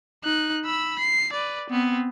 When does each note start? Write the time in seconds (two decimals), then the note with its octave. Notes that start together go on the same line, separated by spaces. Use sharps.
0.24 D#4 F#6
0.65 B5 E6
0.99 C7
1.33 B4 D5
1.70 B3 C4